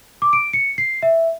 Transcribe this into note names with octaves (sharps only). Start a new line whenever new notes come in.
D6
D7
C#7
C7
E5